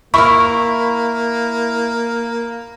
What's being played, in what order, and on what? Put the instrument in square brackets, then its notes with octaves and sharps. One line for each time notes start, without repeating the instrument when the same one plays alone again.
[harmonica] A#3 [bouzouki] E4 A#4 [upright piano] B5 [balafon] C#6